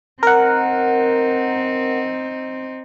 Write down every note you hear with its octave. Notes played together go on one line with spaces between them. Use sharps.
C4 D#4 A#4 F#5